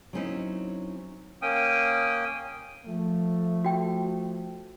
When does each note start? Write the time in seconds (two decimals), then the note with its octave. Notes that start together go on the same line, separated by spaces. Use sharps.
0.13 F#3 A#3 C4 C#4 D#4 E4
1.42 A#3 C#4 G5 D#6
2.86 F3 A3
3.64 F#4 G5